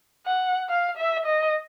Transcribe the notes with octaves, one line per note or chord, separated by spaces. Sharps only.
F#5
F5
E5
D#5